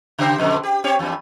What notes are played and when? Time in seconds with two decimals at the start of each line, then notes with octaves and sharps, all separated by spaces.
0.18 C#3 G4 C5
0.38 F2 B2 D3
0.63 G4
0.84 C4 G4 C#5
0.99 E2 G2